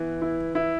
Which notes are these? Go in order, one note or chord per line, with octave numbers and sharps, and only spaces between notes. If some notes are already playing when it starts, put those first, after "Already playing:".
Already playing: E3 B3
E4
E4